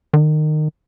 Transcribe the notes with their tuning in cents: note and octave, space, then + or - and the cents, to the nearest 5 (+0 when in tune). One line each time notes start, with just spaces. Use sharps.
D#3 -25